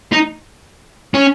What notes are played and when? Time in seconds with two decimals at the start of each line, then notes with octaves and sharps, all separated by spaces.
0.12 D#4
1.14 C#4